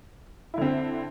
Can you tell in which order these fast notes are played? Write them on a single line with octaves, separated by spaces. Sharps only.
E4 D3 C4